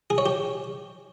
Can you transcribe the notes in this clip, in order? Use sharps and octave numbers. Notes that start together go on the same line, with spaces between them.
G#4
C#5
G4